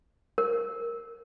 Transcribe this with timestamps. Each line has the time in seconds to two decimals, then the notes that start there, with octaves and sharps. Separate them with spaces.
0.38 A#4